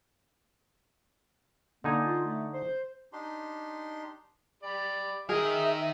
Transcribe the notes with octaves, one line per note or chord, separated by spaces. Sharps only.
D3 A#3 D#4 G#5
F4
A3
C5
D4 D#4 G4 C6
G4 D5 B5
D#3 G#4 A#4 D#5 E5